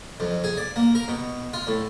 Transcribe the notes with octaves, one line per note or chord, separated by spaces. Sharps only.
F2
G#4
D5
A#3
A#4
B2
F4
A2